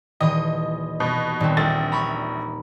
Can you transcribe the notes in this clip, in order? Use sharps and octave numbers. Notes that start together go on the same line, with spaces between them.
D#1 E3 D#5 D#6
B2
D#1 C4
A#1 A6
A#5 B5 C#6